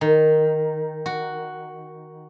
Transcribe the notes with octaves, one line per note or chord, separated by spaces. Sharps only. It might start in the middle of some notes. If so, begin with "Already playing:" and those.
D#3
F#4